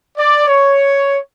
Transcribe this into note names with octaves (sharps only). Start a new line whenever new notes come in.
D5
C#5